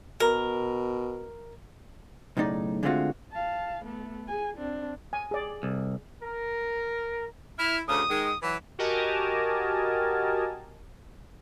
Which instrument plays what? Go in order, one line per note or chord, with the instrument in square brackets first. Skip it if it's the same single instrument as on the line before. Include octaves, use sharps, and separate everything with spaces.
[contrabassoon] B2 [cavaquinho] A#4
[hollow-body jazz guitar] B1 A2 C#3 D#4 D5
D3 G#3 A3 C4 F4 F#4
[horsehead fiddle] F5 A5
A3 B3
G#4 G#5
C4 D4
[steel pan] G#5
G#4 D5
[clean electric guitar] C2
[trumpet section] A#4
[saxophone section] E4 [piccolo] F6
[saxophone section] D2 C#3 [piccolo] D#6
[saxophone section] D#3 G#3
E3 F#3
[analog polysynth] F#4 G4 A#4 D#5 G#5 A5